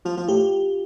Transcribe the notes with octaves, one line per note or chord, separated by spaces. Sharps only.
F3 F4
F3 F4
A2 G4